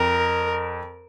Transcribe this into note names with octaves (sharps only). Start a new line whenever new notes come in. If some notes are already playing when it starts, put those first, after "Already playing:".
Already playing: F2 A#4